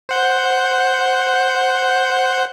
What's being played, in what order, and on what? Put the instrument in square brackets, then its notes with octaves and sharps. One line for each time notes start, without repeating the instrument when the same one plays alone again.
[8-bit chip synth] C5 F#5 G6